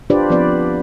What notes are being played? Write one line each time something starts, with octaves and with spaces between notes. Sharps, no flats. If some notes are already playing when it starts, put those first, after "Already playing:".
D4 F4 G4 B4 C5 D5
F3 B3 C4 B4 D5